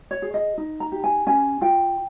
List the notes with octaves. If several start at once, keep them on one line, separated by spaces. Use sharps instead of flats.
C#5
G#4
D#5
D#4
A#5
G4
G#5
C#4 G#5
F4 G5